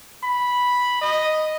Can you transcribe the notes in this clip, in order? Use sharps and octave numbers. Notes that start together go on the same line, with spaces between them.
B5
D#5